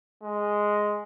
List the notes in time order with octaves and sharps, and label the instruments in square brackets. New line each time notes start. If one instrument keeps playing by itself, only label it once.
[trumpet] G#3